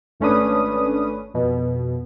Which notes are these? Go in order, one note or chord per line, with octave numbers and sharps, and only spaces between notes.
G#1 A3 C#4 D4 B4 D#6
F2 B2